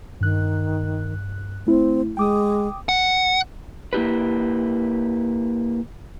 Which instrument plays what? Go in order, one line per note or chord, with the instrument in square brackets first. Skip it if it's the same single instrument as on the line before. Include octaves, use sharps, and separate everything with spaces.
[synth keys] G2 F#6 [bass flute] D#3
[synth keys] A3 E4 [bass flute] C4
[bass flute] G#3 [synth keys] G5 D6 D#6
[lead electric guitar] F#5
[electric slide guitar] A#3 E4 G4 B4